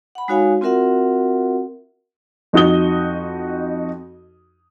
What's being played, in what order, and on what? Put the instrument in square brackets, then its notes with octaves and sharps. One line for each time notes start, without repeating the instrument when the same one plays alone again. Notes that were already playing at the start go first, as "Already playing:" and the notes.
[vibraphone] F#5 B5
G#3 D#4 F#4 C#5 F5 G#5
C4 F4 F#4 A#4 E5 F#5
[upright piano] F2 D#4 F#4 D#6 G7